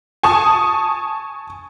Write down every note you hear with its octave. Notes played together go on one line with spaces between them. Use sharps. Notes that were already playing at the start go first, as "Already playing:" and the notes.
G#5 A5 C#6 D#6